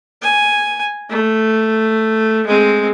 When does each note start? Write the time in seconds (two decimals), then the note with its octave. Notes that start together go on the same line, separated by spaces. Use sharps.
0.22 G#5
1.10 A3
2.46 G#3 C4